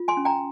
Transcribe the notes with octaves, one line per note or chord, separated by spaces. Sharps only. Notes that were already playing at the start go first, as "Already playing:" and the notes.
Already playing: F4
G#5 C6
C#4
G5 A#5